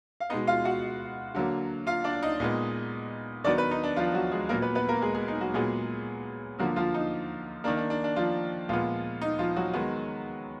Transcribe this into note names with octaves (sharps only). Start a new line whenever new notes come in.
F5
B2 G#3 B3 D#4 D#5
F4 F5
F#4 F#5
D3 F#3 A#3
F4 F5
D4 D5
D#4 D#5
A#2 G#3 B3
D#3 F#3 B3 D4 D5
B3 B4
D#4
D4
F3 F4
F#3 F#4
G#3 G#4
A#2 F#3 A#3 B3 A#4
B3 B4
B3 B4
A#3 A#4
G#3 G#4
G#3 G#4
D#4
F#3 F#4
A#2 F#3 G#3 B3 G#4
D3 F3 F#3 A#3 F#4
F3 F4
D#4
D#3 A#3 D4
D4
D4
D4
F3 F4
A#2 F3 G#3 B3 F4
D#4
F3 F4
F#3 F#4
D#3 G#3 B3